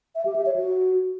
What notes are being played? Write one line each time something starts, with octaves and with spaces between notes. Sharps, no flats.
E5
G4
E5
C#5
F#4